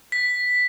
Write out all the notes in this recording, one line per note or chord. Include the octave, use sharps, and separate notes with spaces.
B6